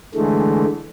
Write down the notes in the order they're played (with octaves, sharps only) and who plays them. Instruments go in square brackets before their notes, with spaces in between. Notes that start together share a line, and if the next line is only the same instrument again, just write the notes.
[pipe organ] D3 E3 G#3 A3